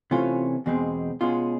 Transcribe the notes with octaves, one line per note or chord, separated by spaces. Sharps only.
C3 E3 A3 C#4 F4
E2 B2 G#3 C4
B2 G#3 C#4 F4